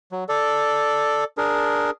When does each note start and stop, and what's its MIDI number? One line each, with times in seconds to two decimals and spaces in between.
0.12 0.24 54
0.29 1.24 69
0.29 1.24 74
1.38 1.90 62
1.38 1.90 68
1.38 1.90 70